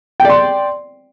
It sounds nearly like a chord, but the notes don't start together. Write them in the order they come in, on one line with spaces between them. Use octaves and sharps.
G5 D5 C6